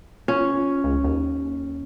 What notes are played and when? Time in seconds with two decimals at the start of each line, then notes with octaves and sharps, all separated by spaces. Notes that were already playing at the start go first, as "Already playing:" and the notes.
0.28 C#4 F4
0.84 C#2
1.04 D#2